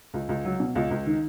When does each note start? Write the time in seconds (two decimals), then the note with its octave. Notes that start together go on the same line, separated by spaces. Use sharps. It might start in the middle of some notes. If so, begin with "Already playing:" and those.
0.14 C#2
0.29 C#2
0.45 F#3
0.60 B2
0.75 C#2
0.91 C#2
1.06 D#3